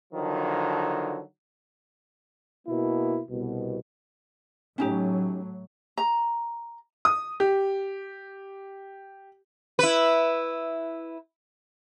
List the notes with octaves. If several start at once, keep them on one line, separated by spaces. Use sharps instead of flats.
D3 D#3 F3 F#3
B2 A#3 E4
C2 B2
A2 F#3 C#4 D#4 G4
A#5
D#6
G4
E4 B4